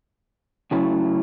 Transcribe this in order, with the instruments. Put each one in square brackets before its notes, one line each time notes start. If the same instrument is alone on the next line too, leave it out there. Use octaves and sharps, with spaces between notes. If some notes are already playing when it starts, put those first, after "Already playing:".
[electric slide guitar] C#3 F#3 A3 C#4 E4